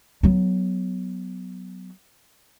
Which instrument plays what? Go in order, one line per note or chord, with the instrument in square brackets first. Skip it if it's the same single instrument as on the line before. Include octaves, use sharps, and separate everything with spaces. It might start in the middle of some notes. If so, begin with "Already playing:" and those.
[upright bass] F#3 B3